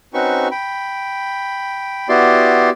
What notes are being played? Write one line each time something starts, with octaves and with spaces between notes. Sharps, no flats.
C4 C#4 D#4 F#4 B4 C#6
G5 B5
B3 E4 F#4 G4 D5 C6